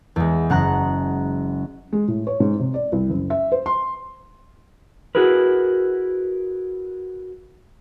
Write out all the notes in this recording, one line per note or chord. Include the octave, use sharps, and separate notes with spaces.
E2 G#3
F#1 F#5 A#5 F#6
G#3
A2
C#5
G#2
C3
D5
C2
F#1
E5
C5
C6
E4 F#4 G#4 A#4 B4